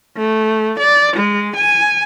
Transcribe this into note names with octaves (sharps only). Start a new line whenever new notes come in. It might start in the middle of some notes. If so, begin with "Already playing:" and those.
A3
D5
G#3
G#5